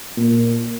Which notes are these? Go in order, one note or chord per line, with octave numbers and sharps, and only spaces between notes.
A#2